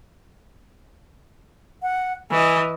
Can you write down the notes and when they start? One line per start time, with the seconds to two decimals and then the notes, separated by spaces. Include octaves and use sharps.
1.83 F#5
2.31 E3 D#5 G#5